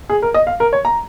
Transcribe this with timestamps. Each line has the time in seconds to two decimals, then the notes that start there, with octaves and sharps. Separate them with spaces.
0.10 G#4
0.22 A#4
0.34 D#5
0.47 F5
0.60 A#4
0.73 C#5
0.85 A#5